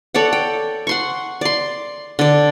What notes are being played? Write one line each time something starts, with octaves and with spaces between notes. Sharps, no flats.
A4 C#5 D5 F#5
G5
F#5 C6 C#6
D5 C6
D3 D5